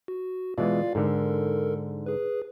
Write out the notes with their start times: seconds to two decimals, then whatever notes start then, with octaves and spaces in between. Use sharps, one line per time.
0.08 F#4
0.58 B2 E3 G#3 F4 D5 F5
0.95 G#2 D3 A4 A#4
2.06 G#4 B4